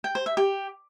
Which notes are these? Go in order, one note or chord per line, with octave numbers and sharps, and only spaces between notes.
G5
C5
E5
G4